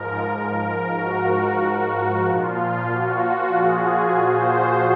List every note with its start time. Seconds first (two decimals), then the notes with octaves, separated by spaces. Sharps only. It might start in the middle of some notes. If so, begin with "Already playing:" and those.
Already playing: G#2 F3 A#4
0.33 A#4
0.64 A#4
0.96 F#4
1.62 F#4
2.27 A#2 F3 F4
2.92 F#4
3.56 G#4
4.21 C5